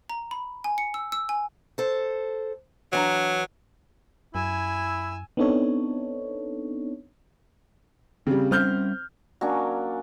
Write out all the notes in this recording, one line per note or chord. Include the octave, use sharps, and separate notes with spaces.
A#5
B5
G#5
C#7
E6
E6
G#5
A4 C5
E3 F#3 D4 A#5
F#2 E4 G#5 E6
B3 C4 D4 D#4 A4 C#5
C#3 G3 C4
G3 C4 C#4 F6 G6
F#3 A#3 C#4 D4